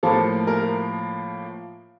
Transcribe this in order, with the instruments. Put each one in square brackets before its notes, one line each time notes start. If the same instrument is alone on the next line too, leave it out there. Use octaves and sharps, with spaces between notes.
[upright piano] A2 F3 A#3 A4
A#4